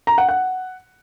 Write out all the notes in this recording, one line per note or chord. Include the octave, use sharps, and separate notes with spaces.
A#5
F#5
F#5